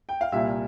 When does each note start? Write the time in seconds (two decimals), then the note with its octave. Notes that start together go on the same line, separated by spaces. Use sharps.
0.09 G5
0.21 F5
0.32 C2 A#2 G3 A#3 E5